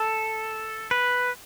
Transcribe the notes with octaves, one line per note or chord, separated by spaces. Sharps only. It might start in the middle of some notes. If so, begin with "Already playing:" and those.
Already playing: A4
B4